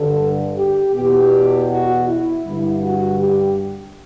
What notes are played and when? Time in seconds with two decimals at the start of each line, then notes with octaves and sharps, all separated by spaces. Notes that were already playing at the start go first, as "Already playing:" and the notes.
Already playing: G2 D3 A4
0.57 G4
0.94 E2 B2 G4
1.69 F#4
2.08 E4
2.45 G2 D3
2.83 F#4
3.20 G4